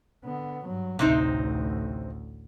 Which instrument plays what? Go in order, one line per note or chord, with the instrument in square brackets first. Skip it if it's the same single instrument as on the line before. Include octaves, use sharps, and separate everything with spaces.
[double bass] D3 B3
G2 F#3
[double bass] A1 D2 [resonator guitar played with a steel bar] C3 C4 D#4